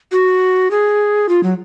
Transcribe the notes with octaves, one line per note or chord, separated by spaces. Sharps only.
F#4
G#4
F4
F#3